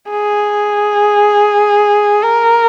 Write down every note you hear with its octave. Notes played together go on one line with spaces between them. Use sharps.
G#4
A#4